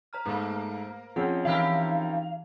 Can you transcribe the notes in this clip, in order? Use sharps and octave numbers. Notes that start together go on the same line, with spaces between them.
C5 A#5 F6
G#2 A3 A#3
F3 C4 C#4 F4 G#4 F#5
E3 D#4 E4 G4 A#4 F5